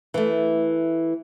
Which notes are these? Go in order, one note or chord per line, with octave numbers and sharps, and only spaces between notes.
E3 A3